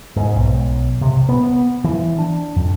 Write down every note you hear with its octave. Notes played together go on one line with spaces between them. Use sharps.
G#2
B1
C3
B3
E3
D4
F2